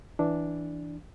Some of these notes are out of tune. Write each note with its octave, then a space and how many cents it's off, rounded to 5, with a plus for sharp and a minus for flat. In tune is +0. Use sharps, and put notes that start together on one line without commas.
E3 -5 D4 +0